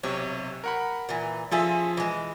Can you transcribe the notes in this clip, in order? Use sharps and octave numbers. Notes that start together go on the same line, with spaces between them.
B1 C3 C#5
A#4 F#5 B5
A#2 E3
F3 C#4 F4 G#4 A4 E5
E3 G#3